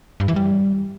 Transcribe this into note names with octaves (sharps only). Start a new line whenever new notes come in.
G2
E3
G3